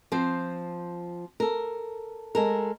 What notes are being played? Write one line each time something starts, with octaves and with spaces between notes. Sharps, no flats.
F3 C4 C5
A4 A#4
G#3 A4 A#4